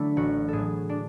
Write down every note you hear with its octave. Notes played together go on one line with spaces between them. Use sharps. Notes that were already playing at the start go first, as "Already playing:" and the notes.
Already playing: D3 F#3 A3 D4 E4
A1 F#4
A2 G#4 A4
F#3
D4